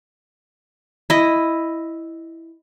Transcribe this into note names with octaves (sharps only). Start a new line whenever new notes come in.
E4 D#5